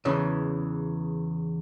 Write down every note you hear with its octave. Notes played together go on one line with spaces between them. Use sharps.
E2 C#3 E3